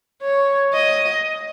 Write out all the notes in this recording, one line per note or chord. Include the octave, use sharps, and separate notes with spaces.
C#5
D#5